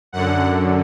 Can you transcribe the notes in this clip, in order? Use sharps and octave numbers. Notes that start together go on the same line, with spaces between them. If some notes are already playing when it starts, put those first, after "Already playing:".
F#2 D3 F#5